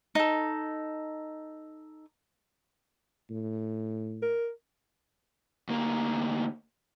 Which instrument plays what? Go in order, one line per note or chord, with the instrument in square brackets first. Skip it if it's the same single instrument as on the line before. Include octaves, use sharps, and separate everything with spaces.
[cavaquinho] D#4 A4
[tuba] A2
[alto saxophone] A#4
[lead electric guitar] D2 A#3